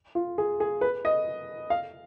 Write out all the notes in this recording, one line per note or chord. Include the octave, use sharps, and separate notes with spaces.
F4
G#4
G#4
B4
D#5
F5